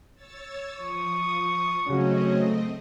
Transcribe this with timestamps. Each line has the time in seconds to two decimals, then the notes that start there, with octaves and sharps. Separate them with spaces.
0.15 C#5 E6 A6
0.75 F3 C#6 D#6
1.88 C#3 F#3 A3 C4 C#4 F#4 D#5